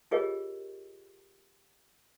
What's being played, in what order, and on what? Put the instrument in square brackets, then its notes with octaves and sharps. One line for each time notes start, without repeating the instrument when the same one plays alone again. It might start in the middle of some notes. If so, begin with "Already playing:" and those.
[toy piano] F4 G4 G#4 A#4 C#5 D#5